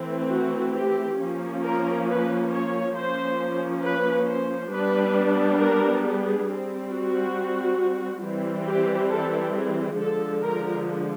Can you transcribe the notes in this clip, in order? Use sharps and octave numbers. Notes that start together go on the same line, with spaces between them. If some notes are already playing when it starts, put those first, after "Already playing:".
Already playing: E3 A3 C4
F#4
G4
F3 A#3 C#4
A#4
B4
C#5
F3 A#3 C#4 C5
B4
C5
G3 B3 D4 B4
A#4
G#4
G3 C4
F#4
E3 G3 C4
G4
A4
G#4
D3 F3 G#3 A4
A#4